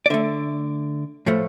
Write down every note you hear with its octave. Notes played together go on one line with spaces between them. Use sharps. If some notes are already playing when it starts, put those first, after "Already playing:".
D5
D3 A3 E5
A2 F3 A3